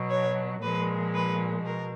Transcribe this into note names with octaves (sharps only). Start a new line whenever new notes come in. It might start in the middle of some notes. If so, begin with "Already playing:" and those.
Already playing: B2 F#3
C#5
A#2 F3 G#3 B4
B4
B2 A#4